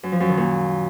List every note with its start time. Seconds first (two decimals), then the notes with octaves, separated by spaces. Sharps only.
0.03 F#2
0.12 F3
0.20 F#2
0.29 D#3
0.37 A#2